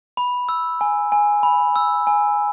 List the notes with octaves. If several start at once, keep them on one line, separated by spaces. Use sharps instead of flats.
B5
E6
G#5
G#5
B5
E6
G#5